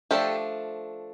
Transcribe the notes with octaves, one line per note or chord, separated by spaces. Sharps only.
F3 A3 D4 G4 A4